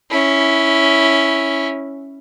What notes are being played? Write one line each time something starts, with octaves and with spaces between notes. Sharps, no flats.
C#4 E4